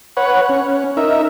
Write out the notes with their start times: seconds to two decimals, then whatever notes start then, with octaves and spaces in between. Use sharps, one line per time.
0.17 B4 C#5 F#5
0.49 C#4
0.97 D#4 A#4 E5